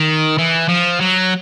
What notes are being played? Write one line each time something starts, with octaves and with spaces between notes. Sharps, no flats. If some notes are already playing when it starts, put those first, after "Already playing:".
Already playing: D#3
E3
F3
F#3